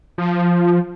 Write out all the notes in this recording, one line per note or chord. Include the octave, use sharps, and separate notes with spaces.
F3